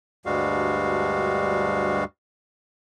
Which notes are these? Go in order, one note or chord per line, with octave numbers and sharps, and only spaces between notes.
D2 G2 G3 G#3 F#4 F5